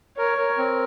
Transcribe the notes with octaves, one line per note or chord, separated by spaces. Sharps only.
A#4 C#5
A#4
C4